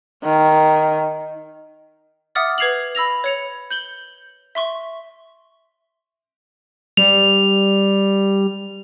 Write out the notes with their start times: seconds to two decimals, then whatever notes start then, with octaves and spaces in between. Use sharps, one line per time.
0.24 D#3
2.35 E5 F#5 D6 D#6 F6 A6
2.58 B4 G#6 C7 F7 F#7
2.95 B5 E6 A#6 F7
3.24 C#5 C#7 F7
3.70 G6 F#7 G7
4.55 E5 C6 C#6
6.97 G3 F7